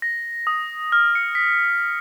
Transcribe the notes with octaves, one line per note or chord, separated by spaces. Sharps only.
A#6
D#6
F6
C#7
B6